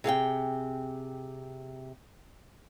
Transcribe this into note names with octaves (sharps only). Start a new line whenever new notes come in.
C3 G#4 F5 G5